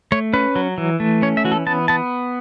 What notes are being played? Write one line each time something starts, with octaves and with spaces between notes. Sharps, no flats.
A3 C#5
C#4 B4
F#3
E3
A3
C#4 C#5
E5
E3 F#4
A4
B3 A5
B3 A5